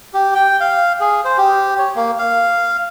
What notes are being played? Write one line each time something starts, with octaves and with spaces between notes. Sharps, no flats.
G4
G5
F5
G#4
C5
G4
C#5
A#3
F5